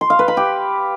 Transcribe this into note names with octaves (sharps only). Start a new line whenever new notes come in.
C6
F5
B4
B5
G4